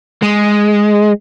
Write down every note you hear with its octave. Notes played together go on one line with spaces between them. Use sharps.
G#3